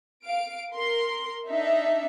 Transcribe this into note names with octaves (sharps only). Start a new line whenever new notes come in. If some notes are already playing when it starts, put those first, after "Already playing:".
F5 D7
A#4 C6
D4 D#4 E5